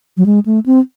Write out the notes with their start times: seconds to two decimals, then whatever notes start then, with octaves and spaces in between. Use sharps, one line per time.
0.17 F#3
0.26 G#3
0.46 A3
0.66 C4